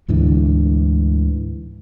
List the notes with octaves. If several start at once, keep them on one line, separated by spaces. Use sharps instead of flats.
D2 G#2 D3 E3